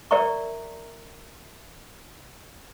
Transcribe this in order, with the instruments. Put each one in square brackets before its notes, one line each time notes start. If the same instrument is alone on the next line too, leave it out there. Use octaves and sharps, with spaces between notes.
[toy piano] A#4 D5 E5 A#5 C#6